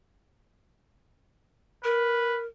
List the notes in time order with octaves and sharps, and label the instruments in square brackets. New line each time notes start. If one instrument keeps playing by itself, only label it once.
[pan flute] A#4 [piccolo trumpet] B4